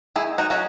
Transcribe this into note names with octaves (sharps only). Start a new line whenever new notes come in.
D#3 E4 G#4
D#4 F#4
F#3 C#4 F#4